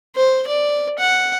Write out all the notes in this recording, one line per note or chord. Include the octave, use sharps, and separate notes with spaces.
C5
D5
F#5